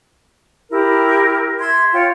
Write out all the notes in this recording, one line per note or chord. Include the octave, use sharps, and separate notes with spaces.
E4 G4 A#4
E5 C6 G#6
F4 C#5 G5